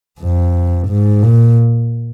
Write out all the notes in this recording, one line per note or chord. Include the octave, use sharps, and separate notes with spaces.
F2
G#2
A#2